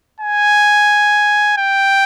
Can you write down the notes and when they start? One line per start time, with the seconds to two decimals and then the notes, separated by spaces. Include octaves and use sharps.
0.20 G#5
1.58 G5